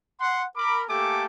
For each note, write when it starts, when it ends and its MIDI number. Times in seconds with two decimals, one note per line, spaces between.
0.20 0.43 78
0.20 0.43 84
0.56 0.83 70
0.56 0.83 83
0.56 0.83 86
0.89 1.26 57
0.89 1.26 58
0.89 1.26 67
0.89 1.26 69
0.89 1.26 80
0.89 1.26 86